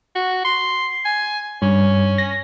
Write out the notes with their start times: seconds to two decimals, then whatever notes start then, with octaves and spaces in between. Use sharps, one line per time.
0.15 F#4
0.45 C6
1.05 G#5
1.62 G2 C#4
2.18 A#6